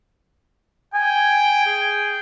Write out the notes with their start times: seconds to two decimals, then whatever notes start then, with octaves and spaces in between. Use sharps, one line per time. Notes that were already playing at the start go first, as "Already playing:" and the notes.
0.94 G5 G#5
1.67 G#4